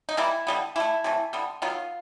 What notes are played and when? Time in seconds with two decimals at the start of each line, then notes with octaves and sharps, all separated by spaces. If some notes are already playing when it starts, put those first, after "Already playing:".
0.09 D#4
0.17 E3 G3 A#3 E4
0.47 D3 G3 B3
0.76 E3 A3 E4
1.04 C3 E3 A3
1.33 D3 G3 B3
1.62 D#3 F#3 B3 F4